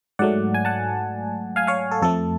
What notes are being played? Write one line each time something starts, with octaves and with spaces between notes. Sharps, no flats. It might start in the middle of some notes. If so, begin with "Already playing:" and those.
G#2 F#3 A3 D5 F#5
G#5
F#5 A5
F5 G#5
C#5 F5
A4
F2 F3 A3 A4